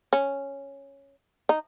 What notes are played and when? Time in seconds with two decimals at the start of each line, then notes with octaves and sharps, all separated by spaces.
0.13 C#4
1.49 D#4